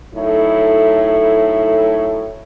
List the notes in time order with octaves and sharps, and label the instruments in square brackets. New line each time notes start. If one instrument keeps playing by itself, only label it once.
[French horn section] F#2 A2 D#4 E4 A4